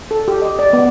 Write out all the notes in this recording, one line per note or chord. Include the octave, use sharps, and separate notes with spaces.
A4
G4
D#5
D5
B3